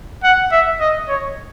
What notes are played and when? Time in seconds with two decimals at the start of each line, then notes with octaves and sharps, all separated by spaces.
0.24 F#5
0.52 E5
0.80 D#5
1.09 C#5